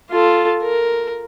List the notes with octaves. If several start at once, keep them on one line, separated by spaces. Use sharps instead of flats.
F4 A4
A#4